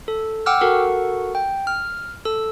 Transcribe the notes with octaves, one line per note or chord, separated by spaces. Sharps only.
A4
F#5 G5 D6 E6 F6
F#4 A4 A#4 F#5 C#6
G5
F6
A4 E6